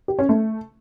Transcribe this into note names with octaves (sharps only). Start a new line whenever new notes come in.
G4
C#4
A3